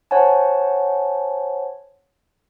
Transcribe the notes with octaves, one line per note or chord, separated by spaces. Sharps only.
C5 C#5 F#5 G#5 A5